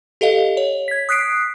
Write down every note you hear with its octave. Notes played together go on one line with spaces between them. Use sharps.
G4 A4 D#5 F5
C#5
G#6 B6
D#6 F#6 B6 C7 D7